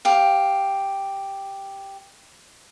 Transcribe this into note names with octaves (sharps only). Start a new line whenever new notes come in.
G4 F5